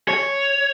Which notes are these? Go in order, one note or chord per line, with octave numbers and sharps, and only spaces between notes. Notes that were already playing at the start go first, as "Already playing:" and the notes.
C#5